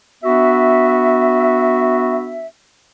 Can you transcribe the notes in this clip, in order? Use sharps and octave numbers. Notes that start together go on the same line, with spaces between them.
B3 D4 F#4 E5